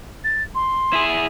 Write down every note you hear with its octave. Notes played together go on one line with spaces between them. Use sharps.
A6
C6
E4 G#4